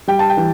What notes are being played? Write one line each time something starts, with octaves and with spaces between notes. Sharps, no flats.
G3 G5
A5
G5
E3